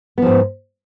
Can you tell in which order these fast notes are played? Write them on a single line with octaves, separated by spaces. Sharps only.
B3 F3 G#2